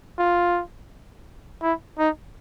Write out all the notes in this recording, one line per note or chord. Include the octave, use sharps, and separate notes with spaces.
F4
E4
D#4